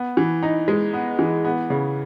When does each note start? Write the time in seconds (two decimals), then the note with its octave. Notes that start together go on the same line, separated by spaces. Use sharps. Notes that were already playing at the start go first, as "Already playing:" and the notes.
Already playing: B3
0.17 E3
0.43 D#4
0.68 G#3
0.93 B3
1.19 E3
1.44 B3
1.70 C#3